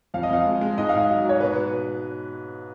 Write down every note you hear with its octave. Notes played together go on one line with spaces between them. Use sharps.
F2 F5
D#5
F2 F5
G#3
G#3
G#2 D#5
G#2 F5
D#5
F#3
G#2 C#5
B2 B4